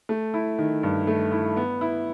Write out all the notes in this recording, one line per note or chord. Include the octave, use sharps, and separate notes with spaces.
A3
E4
D#3
G2
A3
E4
B3
E4